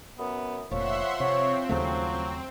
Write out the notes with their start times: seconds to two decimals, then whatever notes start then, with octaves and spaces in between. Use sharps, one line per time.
0.19 F#2 B3
0.71 F1 A#2 F3 C#5 E5 F#5 C6
1.20 C3 C4 C#5
1.69 D#2 C#3 F#3 A3